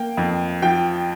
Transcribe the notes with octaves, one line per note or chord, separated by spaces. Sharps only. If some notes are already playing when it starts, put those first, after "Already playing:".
Already playing: A#3 G5
F2
F3 G5